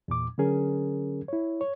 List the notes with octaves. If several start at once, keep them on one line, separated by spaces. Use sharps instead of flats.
E2 A#2 D6
D3 F#3 C#4 G#4 A#4
E4 C#5
C#5